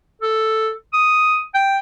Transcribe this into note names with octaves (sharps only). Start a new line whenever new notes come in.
A4
D#6
G5